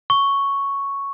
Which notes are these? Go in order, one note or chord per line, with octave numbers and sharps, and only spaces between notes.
C#6